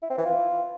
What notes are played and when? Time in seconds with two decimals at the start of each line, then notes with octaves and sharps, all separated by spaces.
0.02 E4
0.10 C4
0.18 E3
0.26 F4